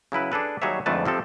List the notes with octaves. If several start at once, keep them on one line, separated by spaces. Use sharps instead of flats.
C#3 F#3 E4 B4
D4 G#4 A4 B4
D#2 F#3 G3 G#4 C#5 E5
F2 G#2 D3 A3 B4 A5
C3 F3 C4 A4